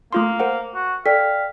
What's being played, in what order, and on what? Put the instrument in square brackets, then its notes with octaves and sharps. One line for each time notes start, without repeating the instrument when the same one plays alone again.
[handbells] A3 F4 C6 [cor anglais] A#3
[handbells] A#4 C5 F#5
[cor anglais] F#4
[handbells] A4 [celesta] D5 G5 B6 [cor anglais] F5